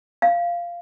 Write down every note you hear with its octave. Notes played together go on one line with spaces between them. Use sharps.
F5